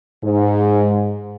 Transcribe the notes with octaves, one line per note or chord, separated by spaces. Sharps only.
G#2